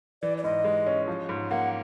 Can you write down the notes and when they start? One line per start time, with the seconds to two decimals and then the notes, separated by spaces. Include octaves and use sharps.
0.22 E3 D5
0.38 D5
0.44 G#2 D#5
0.64 G#3
0.87 C#4
1.07 F3
1.29 G#2
1.50 A#3 F#5